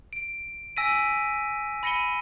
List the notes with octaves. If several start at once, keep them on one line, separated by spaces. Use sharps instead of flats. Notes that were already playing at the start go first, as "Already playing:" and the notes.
D7
G#5 E6 A#6 B6 D7 D#7
B5 A#6 C#7 D#7 G7